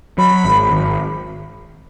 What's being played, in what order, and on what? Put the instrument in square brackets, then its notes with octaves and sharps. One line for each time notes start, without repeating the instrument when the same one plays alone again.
[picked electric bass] F#3 [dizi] B5
[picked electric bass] G#1
G#1